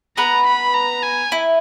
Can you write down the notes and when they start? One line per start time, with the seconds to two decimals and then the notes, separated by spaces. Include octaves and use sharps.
0.17 B3 B4 A#5
0.46 B5
0.74 A#5
1.03 G#5
1.32 E4